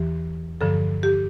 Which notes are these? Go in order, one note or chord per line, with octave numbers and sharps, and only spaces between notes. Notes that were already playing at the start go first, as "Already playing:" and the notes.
Already playing: E2 E3 G4
G2 D3 F3 A4
G4